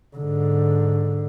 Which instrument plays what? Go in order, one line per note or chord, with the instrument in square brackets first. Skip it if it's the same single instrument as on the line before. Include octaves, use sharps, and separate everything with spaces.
[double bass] G#2 D3